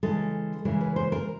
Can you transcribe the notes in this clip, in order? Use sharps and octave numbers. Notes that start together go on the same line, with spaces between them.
C#3 E3 G#3 A4
C#3 E3 G#3 A#4
B4
C5
A#4